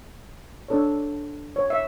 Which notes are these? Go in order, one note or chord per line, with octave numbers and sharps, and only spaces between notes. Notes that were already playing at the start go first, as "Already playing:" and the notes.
D4 A4 C#5
C#5
E5